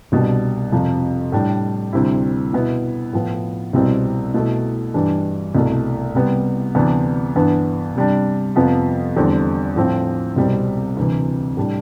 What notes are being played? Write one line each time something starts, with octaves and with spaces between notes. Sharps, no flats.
C2 B2 G3 D4
F2 C3 F3
A2 G3 D4
D2 C3 G3 C4 E4
B2 B3 E4
A2 F3 B3
C2 B2 G3 C4 E4
B2 A3 E4
G2 E3 G3 D4
C2 B2 A3 E4
C3 G3 B3
D2 C3 E3 B3 D4
G2 E3 B3 D4
C3 G3 D4
F2 C3 F3 B3
E2 D3 G3 C4
A2 F3 C4 E4
C2 B2 G3 C4
D2 C3 E3
A2 G3 D4